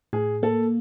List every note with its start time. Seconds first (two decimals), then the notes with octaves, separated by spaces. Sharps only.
0.13 A2 G#4
0.43 A#3 A4